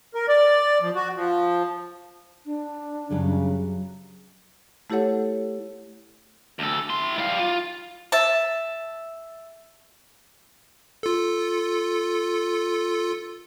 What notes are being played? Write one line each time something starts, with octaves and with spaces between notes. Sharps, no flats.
A#4
D5
F3
F#4
F3
D4
F#2 C#3 F#3 G3
A3 E4 G4 A4 C#5 F#5
D2 A4
E4 C6
G3 F5
F4
E5 A5
F4 A4